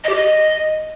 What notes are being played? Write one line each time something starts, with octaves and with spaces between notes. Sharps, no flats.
D#5
G4
D#5